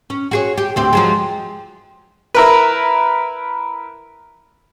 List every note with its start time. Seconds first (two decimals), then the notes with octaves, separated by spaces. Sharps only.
0.10 C#4
0.31 F#4 G#4 C#5
0.58 G4
0.76 D2 C4 G4
0.93 F3 F#3 G#3
2.34 E4 A#4 B4